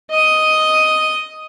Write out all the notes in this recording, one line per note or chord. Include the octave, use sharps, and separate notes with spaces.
D#5 D#6